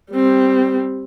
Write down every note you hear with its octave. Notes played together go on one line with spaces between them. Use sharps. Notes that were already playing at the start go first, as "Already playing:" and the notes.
G3 C4